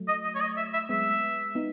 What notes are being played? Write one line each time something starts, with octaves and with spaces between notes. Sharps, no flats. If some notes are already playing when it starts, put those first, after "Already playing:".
Already playing: F#3 A3
D#5
D#5
C#5
D#5
E5
E5
G#3 B3 E5
B3 D#4